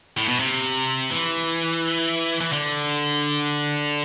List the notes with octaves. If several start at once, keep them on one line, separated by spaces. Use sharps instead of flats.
A2
B2
C3
E3
E3
D3